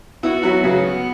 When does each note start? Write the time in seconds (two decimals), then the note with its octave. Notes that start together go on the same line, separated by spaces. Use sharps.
0.23 B3 E4 F#4
0.43 F#3 B3
0.63 C#3 F#3
0.84 B3